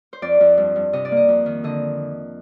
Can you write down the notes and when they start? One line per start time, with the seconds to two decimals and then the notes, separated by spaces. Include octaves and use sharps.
0.13 C5
0.22 F2 D5
0.40 F2
0.57 G2
0.76 G2
0.93 C3 D#5
1.05 D5
1.11 A#3
1.17 D#5
1.29 F2
1.46 D#3
1.64 D3 D#5